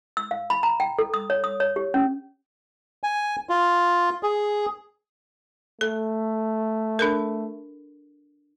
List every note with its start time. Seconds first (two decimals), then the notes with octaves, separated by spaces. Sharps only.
0.17 E6
0.31 F5
0.50 B5
0.63 A#5
0.80 G5
0.99 A4
1.14 D#6
1.30 C#5
1.44 D#6
1.60 C#5
1.76 G4
1.94 C#4
3.04 G#5
3.49 F4
4.23 G#4
5.81 A3 A4
6.99 D4 A4 A#4